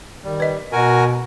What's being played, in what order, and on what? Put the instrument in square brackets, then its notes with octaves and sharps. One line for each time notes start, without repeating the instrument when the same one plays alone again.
[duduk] D#3 [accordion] G3
[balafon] B4 D#5
[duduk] B2 [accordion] F#4 A#4 G#5